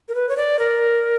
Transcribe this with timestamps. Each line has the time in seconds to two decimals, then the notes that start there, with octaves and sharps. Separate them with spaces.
0.08 A#4
0.15 B4
0.29 C#5
0.37 D5
0.59 A#4